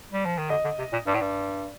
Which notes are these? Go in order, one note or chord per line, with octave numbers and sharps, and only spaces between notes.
G3
F3
D#3
D3 D#5
D3
C3
A#2
G2 D5
A2
G2